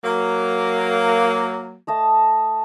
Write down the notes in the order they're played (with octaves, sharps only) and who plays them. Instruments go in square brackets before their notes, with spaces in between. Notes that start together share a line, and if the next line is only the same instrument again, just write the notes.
[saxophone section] F#3 A#3
[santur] A3 D#5 A5